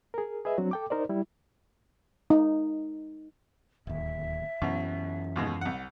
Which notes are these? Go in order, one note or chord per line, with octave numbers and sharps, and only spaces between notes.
G#4 A#4
G#4 B4 D#5 E5
F#3 C4 D4 F#4
A4 G5 D6
D#4 A#4 C5 D5
G3 E4
D#4
D1 D#2 E5
F#2 B2 E3 F#3 C#4
D#2 B2 G#3
C2 F#5